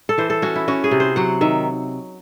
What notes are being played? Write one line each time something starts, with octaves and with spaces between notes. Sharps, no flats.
A4
E3 C5
A4
C#4 F#4
E4
C#4 F#4
G#4
C3
C5
F#3 F#5
D#3 E5